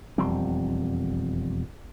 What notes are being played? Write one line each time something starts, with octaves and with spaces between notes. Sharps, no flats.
E1 F2 G3 C4